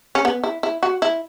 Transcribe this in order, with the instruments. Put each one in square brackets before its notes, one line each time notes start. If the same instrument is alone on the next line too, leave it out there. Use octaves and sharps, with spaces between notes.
[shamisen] C#4
B3
E4
E4
F#4
E4